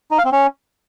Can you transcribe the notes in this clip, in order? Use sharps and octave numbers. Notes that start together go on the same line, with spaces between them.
D#4
F5
C4
C#4